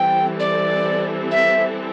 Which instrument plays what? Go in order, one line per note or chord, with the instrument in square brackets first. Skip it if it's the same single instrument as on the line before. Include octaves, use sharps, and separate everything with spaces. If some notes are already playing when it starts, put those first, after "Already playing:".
Already playing: [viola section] E3 G3 C4 A4 [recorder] G5
[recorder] D5
E5